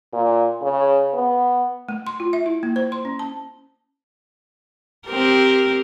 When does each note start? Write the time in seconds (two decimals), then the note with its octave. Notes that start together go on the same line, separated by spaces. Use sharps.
0.13 A#2
0.62 C#3
1.14 B3
1.89 A3
2.07 C6
2.20 F4
2.33 E5
2.46 E4
2.63 A#3
2.76 C5
2.92 C6
3.05 C#4
3.19 A5
5.07 C4 G4 A#4